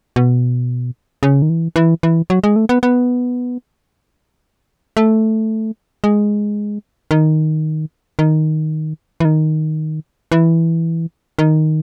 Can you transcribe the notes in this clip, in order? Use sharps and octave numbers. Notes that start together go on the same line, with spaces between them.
B2
C#3
D#3
E3
E3
E3
F#3
G#3
A3
B3
B3
A3
G#3
D#3
D#3
E3
D#3
E3
D#3